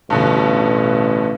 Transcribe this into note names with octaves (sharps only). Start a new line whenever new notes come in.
A1 G2 B2 D3